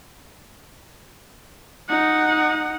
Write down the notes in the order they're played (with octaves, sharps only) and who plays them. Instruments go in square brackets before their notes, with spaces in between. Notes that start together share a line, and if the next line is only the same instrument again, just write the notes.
[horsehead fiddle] D#4 F#5